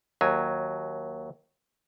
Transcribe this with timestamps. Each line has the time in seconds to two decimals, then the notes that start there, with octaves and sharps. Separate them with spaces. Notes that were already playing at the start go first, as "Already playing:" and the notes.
0.21 D#2 F#3 G#5